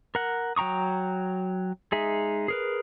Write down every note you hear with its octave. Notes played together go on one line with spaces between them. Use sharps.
A#4 F#5
F#3 G5 A#5 C#6 D#6
G#3 D#4 G#4 E5
G#4 A#4 B4